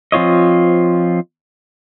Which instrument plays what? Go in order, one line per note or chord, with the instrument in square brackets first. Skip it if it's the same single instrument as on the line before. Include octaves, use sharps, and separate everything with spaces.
[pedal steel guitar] F3 C4 F4 C#5 D#5